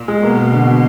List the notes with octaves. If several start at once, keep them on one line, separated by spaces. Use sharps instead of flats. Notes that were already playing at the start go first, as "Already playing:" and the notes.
Already playing: A#2
G#3
B2 A#3
A#3
D3
D3